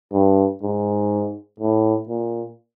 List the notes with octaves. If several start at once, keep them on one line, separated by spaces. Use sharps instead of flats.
G2
G#2
A2
A#2